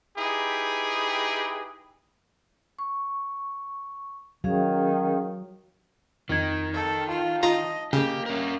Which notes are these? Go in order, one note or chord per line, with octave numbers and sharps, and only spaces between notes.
D#4 E4 G4 G#4 B4 G5
C#6
D#3 F#3 C#4 G#4 F5
F2 D#3 D#4 G#6
A4
F4 A5
F4 D#5 A#5 A#6
C#3 A#3 G4
C#4 A#4